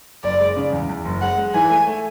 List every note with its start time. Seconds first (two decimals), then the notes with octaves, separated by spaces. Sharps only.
0.24 F#1 D5
0.40 G#3
0.56 C#3
0.72 E2
0.89 E2
1.05 F#1
1.21 G#3 F#5
1.38 G#3
1.54 E3 G#5
1.70 A3
1.87 A3